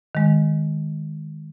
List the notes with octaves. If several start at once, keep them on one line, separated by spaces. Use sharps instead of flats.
D#3 G#3